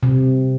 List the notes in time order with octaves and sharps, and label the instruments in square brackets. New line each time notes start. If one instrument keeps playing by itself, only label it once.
[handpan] C3